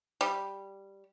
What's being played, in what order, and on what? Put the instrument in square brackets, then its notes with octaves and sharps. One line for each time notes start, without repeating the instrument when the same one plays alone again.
[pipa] G3